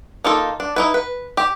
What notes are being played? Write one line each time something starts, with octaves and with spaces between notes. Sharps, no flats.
A#3 D#4 F4 A4
D4
D#4 E4 B4
B4
G4